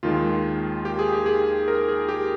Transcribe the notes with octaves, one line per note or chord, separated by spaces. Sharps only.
D#2 D#3 G#3 F4
G4
G#4
G4
G#4
A#4
G#4
G4